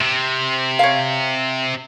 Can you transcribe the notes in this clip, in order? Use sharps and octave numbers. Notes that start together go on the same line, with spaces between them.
C3
C#5 F5